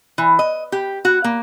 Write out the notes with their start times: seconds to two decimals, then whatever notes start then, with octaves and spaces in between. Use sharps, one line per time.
0.18 E3
0.39 D#5
0.72 G4
1.05 F#4
1.24 A#3